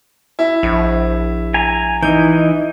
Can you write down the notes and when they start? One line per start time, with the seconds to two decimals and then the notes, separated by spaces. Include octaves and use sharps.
0.39 E4
0.63 A#1
1.54 G#5 A#5
2.03 E3 D#4 G6